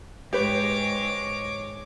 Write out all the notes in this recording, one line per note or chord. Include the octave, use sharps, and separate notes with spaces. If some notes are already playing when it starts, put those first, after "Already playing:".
G#2 G#3 G4 B4 C#5 D6